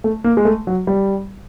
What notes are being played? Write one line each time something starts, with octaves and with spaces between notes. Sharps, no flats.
A3
A#3
G#3
A3
F#3
G3